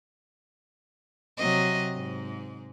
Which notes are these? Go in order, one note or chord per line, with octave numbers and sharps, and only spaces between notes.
C3 F#3 D#5
G#2